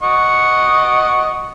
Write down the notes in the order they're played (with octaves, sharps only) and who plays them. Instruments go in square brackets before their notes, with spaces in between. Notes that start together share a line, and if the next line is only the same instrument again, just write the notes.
[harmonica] D#5 F#5 C#6